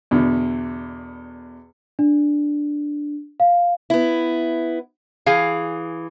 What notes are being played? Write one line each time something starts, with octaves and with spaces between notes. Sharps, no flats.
E2 B2 D3
D4
F5
B3 E4
E3 G#4 F5